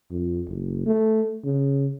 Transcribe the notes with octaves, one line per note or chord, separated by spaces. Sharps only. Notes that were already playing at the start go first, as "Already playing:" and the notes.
F2
F#1
A3
C#3